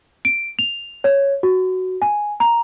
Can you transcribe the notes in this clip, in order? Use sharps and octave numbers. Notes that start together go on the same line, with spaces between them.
D7
F7
C#5
F#4
G#5
A#5